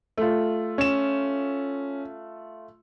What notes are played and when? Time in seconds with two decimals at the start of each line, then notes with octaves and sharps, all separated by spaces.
0.18 A3 F4
0.78 C#4 E7